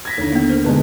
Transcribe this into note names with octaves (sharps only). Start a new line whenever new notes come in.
G#6 A#6 B6
D#2 D3 E4 C#5
A#3 B3
A#4 C5
G#2 B2 D3 G#3 B4